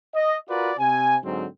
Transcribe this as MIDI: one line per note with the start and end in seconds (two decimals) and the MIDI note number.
0.15 0.37 75
0.49 0.72 65
0.49 0.72 66
0.49 0.72 70
0.49 0.72 71
0.49 0.72 74
0.79 1.17 48
0.79 1.17 80
1.24 1.47 44
1.24 1.47 50
1.24 1.47 54
1.24 1.47 60